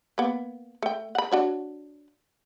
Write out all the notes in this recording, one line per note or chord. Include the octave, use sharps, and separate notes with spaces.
A#3 B3
A3 G5
F#5 B5
D4 F#4 C#5